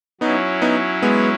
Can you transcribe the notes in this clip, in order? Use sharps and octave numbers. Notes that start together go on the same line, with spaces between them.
F#3 B3 C#4 D#4 E4
B3 D#4
G#3 B3